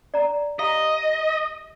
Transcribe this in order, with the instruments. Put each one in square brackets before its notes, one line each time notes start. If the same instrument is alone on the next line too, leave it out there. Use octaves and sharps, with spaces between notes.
[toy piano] D5 A#5
[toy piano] G4 F5 A#5 [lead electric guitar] D#5